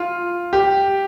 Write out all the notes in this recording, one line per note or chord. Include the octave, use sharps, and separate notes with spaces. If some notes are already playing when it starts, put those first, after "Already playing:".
Already playing: F4
G4